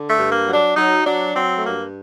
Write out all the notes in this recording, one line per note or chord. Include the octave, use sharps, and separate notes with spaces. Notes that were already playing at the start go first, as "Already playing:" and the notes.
Already playing: D3
A3
G2
A#3
F#3
D4
F#3 D#4
F#3 D4
F#3 C4
A3
G2 A#3